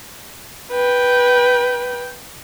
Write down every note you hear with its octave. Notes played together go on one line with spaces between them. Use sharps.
B4 G5